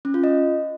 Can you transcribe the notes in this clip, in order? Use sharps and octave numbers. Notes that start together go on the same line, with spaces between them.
C#4
F4
D#5